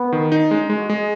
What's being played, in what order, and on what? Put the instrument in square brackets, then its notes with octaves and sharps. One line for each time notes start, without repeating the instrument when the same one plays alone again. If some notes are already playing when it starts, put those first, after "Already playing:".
Already playing: [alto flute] B3
[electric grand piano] D#3
D#4
[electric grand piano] G#3 [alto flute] C#4
[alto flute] F4
D#4
[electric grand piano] G#3
[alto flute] F#4
[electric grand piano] G#3 [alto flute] G#4